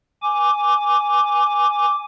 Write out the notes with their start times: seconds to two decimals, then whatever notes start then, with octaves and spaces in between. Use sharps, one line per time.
0.22 G#5 D6